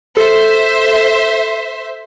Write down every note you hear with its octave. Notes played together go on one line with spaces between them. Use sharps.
A4 C5 E5